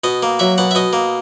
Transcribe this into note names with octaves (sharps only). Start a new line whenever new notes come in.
B2 D#5
A#3
F#3 E5
B2 F#5
E5
B2 D#5
A#3